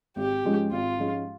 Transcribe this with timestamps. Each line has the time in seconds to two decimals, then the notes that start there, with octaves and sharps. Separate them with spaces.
0.16 G#1 G4
0.44 G#2 F3 G#3 C#4
0.71 G#1 F4
0.98 G#2 F3 G#3 C#4